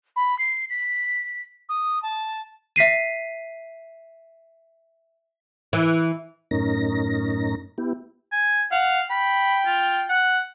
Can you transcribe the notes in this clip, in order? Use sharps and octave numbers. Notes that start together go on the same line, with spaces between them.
B5
C7
B6
D#6
A5
E5 B6 C7 D#7
E3
F#2 A2 C#4 D#4 A#4 A#6
B3 E4 G4
G#5
F5 F#5
G5 B5
F4
F#5